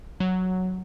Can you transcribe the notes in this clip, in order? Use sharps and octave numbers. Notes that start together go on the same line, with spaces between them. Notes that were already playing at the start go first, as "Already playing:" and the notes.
F#3